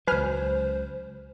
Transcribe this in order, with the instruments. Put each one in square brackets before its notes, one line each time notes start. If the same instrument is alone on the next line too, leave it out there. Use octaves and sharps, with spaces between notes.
[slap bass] C#2 F#3 [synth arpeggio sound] B4 G#5 F6 [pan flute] C5